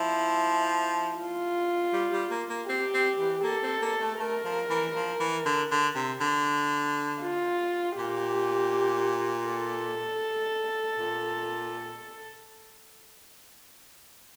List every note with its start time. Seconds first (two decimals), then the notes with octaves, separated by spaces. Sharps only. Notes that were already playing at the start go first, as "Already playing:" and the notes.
Already playing: F3 E4
1.17 F4
1.93 G3
2.12 G3
2.30 A#3
2.49 A#3
2.69 C4 G4
2.93 C4
3.19 E3
3.43 A#3 A4
3.63 C4
3.82 A#3
4.01 A3
4.20 A3 A#4
4.44 F3
4.70 E3
4.95 F3
5.20 E3
5.46 D3
5.71 D3
5.95 C3
6.20 D3
7.21 F4
7.97 A#2 G4
9.48 A4
10.98 A#2